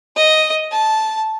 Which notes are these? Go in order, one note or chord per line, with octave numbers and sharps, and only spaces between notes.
D#5
A5